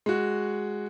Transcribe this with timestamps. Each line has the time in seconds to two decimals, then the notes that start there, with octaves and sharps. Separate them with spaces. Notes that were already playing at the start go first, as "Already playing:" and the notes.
0.06 G#3 F#4